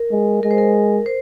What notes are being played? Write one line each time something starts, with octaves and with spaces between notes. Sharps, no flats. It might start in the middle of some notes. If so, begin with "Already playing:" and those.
Already playing: A#4
G#3
G#3 A#4
C5
A#4
C5